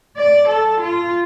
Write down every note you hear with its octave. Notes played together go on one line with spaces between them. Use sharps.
D5
A4
F4